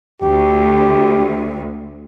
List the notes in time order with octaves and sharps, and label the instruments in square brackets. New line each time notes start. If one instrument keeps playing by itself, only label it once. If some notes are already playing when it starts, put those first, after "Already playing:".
[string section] D2 [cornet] G4